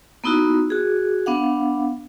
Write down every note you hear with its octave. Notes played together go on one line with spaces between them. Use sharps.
A#3 B3 D#4 E4 F#4
F#4 G#4
B3 D4 F5 F#5